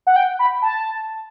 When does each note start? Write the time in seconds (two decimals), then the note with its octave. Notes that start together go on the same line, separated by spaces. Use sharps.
0.07 F#5
0.16 G5
0.39 B5
0.62 A5